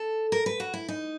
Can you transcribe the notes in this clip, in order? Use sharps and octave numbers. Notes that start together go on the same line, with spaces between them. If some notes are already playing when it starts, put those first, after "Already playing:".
Already playing: A4
A#4
B4
F#4
E4
D#4